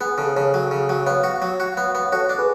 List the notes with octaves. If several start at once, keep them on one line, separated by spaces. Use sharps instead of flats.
B3 G#4
C#3 A4
C#3 A4 C#5
F#3
C#3
F#3
B3 C#5 F5
F#4
F#3
F#4
B3
B3
F#4 A4 C#5
D4
G#4 B4